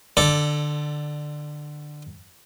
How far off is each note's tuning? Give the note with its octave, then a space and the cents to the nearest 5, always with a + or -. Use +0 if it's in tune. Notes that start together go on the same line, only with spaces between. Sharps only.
D3 +20 A4 +0 D5 +0